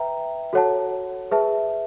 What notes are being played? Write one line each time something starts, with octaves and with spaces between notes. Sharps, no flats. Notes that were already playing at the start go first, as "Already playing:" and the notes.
Already playing: B4 E5 G5 A#5
F#4 A4 C#5 F#5 A5
G#4 B4 E5 A5